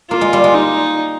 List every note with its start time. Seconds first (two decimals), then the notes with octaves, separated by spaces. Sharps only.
0.10 A#3 F4
0.21 G#3
0.33 G3
0.44 G#3
0.54 D#4